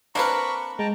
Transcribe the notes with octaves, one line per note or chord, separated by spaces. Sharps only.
A#3 C4 D4 A#4 B4 B5 C#6
G#3 G5 A5 A#5